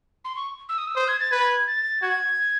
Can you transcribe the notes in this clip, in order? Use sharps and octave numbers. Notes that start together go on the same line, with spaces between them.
C6
C#6
E6
D#6
E6
C5 D#6
G#6
A6
B4 G#6
A6
F#4 G#6